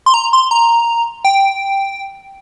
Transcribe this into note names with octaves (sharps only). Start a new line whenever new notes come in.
C6
A#5
C6
A#5
G5